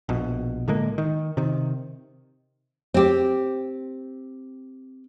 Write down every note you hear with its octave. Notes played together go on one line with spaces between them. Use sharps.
A#1 B2
A2 D3 G#3 A#3
D#3
C3 D#3
C4 G4